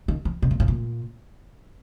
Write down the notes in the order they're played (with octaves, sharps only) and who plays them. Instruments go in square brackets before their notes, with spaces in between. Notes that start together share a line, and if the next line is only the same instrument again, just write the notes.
[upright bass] D#3
E3
B2
A#2
A2
A#2